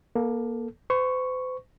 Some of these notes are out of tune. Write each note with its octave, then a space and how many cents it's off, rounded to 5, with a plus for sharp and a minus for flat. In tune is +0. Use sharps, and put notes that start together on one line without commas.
A#3 +25 A4 +0
C5 -45 C#6 +0